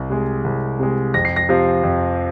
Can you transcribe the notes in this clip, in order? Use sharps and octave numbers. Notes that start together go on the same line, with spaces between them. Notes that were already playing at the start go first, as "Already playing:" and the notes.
Already playing: C2
C3 G#3
C2
C3 G#3
F2 A#6
C7
A#6
C3 F3
F2